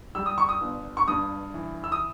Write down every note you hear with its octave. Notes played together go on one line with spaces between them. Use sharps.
G3 E6
D#6
C#6
D#6
G1
C#6
G2 D#6
E3
E6
D#6